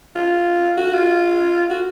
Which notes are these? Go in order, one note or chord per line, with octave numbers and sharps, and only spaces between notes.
F4
F#4
F4
F#4